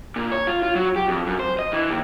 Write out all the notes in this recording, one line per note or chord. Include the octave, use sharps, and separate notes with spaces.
A#2
C#5
F4
F4
F#3
G4
F2
F#2
C5
D#5
E3
D#2